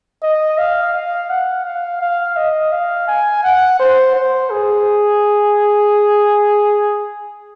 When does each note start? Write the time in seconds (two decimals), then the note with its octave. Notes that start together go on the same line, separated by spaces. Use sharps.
0.23 D#5
0.58 F5
0.95 F5
1.30 F#5
1.65 F5
2.01 F5
2.37 D#5
2.72 F5
3.08 G#5
3.44 F#5
3.80 C5
4.16 C5
4.51 G#4